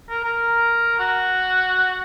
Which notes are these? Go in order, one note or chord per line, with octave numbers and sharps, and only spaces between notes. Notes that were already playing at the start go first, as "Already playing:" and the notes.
A#4
A#4
F#4